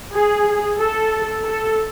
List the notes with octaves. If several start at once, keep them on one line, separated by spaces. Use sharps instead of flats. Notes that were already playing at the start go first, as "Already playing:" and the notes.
G#4
A4
A4